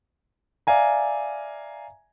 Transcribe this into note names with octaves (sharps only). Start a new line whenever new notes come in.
D5 E5 F5 G#5 A#5